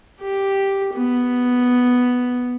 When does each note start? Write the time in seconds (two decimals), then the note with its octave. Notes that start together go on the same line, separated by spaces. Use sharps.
0.21 G4
0.94 B3